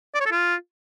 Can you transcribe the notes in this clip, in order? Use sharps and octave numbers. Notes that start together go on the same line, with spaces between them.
D5
C#5
A4
F4